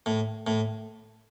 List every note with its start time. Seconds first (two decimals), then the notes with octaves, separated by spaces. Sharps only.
0.06 A2
0.47 A2